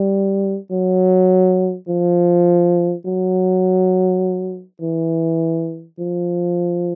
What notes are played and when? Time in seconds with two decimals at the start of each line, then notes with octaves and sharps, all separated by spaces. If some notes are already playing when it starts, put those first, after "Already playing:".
Already playing: G3
0.71 F#3
1.88 F3
3.05 F#3
4.81 E3
5.99 F3